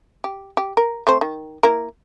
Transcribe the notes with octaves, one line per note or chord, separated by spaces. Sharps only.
G4
G4
A#4
A3 C4 C5
D#3
A#3 E4 A#4